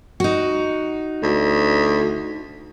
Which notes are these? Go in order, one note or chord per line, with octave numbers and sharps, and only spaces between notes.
D#4 F#4
D2